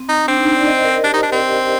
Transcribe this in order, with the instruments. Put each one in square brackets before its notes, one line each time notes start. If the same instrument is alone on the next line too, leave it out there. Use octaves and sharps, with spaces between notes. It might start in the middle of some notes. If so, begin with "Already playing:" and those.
Already playing: [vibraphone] C4
[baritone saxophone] D#4
[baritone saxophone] C4 [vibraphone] D4
[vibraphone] D#4
D5
D#5
C5
A#4
[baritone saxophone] D4 [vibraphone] G4
[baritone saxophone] D#4
D4
C4